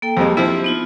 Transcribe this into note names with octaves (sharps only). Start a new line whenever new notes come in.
A#3 A4 G5
F2 G3 G#3
F3 C4 E4 G4
B3 D#4 F4